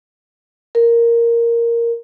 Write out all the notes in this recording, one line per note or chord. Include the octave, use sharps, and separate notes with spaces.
A#4